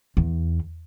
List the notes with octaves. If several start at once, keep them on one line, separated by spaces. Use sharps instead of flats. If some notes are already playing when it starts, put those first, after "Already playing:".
E2